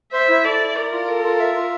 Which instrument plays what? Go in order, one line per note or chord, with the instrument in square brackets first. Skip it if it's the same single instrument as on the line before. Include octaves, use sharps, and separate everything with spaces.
[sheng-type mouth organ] C5 [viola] E5
[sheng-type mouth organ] E4
[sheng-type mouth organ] A4 [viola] D5
[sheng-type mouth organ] E4
[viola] A#4 [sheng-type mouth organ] D5
[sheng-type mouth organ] F4
A4
F4
E5
F4